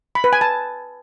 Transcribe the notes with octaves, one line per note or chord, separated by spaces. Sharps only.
B5
B4
G#5
A5